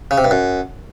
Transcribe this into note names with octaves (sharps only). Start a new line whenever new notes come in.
C#3
C3
G2
F#2